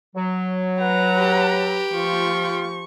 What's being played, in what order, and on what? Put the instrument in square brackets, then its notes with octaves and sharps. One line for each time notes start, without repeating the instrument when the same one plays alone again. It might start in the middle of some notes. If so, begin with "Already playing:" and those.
[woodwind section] F#3
[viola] B4 A#5 [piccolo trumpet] F#5
[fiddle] G4
[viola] F3 C#6 [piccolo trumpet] F4